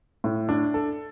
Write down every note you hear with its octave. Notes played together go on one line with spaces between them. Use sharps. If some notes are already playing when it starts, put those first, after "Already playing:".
A2
D4
A4